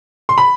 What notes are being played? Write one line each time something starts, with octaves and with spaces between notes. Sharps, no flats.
C6
B5